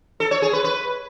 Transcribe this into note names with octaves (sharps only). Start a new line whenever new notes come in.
A4
C#5
G#4
B4
B4